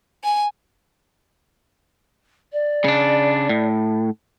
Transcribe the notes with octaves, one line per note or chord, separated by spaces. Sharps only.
G#5
D5
C#3 D4
A2